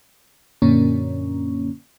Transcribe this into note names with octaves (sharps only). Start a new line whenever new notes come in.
F#2 A#2 D3 A#3 C#4